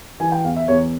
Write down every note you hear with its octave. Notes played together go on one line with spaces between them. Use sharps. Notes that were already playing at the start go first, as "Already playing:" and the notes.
E3 G#5
G5
E2 F5
E5
E2 C#5